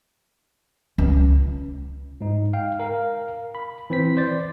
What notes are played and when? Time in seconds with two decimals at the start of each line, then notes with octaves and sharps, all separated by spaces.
0.98 C#2
2.21 G#2 D#4
2.53 F5 G5
2.80 A#4 F5
3.55 B5
3.90 E3 C4 C5 B6
4.17 C5 D5 A6